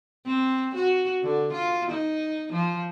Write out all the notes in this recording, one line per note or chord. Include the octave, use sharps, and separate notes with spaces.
C4
F#4
D3
F4
D#4
F3